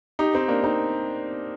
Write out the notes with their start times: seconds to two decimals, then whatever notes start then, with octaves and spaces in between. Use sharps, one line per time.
0.19 D#4 G4
0.35 C4 D#4
0.48 A#3 D4
0.64 C4 D#4